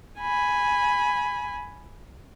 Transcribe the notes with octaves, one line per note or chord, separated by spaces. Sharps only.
G#5 B5